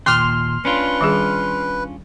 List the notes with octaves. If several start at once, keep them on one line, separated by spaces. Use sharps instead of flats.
D#2 A#2 A#3 C6 D6 F6
C#4 D4 F4 B4
D#3 G3 G#4